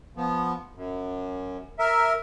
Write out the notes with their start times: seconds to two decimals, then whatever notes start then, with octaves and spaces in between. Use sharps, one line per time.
0.17 F3 B3
0.75 F#2
1.79 A#4 E5